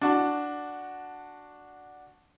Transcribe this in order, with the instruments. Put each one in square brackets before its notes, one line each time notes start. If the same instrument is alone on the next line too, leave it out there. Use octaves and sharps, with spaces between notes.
[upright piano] D4 F#4 A5